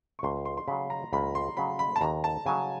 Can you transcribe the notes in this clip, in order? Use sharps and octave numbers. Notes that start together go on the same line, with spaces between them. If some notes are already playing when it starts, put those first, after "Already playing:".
C#6
C#2 C6
C6
C6
C#3 F#3 B5
A#5
C#2 B5
C6
C#3 F#3 B5
B5
A5
D#2 A#5
A5
C#3 F#3 G#5